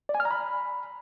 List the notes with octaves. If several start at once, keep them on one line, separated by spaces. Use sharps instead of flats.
D5
G#5
F6
A#5
B5